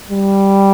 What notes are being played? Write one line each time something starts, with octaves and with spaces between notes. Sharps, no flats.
G3